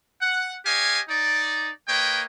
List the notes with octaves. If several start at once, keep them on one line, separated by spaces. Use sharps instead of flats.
F#5
G4 C#5 D#5 F5 G#5
D#4 D5
A#3 B4 C#5 D#5 G5